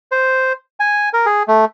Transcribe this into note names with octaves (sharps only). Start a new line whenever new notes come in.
C5
G#5
A#4
G#4
A3